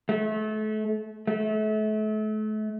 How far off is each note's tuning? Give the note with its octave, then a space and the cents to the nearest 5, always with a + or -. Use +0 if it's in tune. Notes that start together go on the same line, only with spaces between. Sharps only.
A3 -30
A3 -35